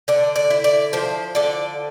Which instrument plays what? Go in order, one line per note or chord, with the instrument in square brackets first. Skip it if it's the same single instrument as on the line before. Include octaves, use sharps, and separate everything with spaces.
[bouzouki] D3 D5
D5
E4
D5
F3 C5
D3 D5